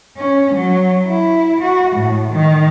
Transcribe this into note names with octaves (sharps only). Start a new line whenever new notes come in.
C#4
F#3
E4
F#4
A2
D#3